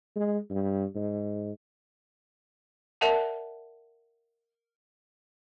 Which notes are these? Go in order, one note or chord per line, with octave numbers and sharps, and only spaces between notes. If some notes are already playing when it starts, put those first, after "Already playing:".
G#3
G2
G#2
A#4 D5 E5 F#5 A5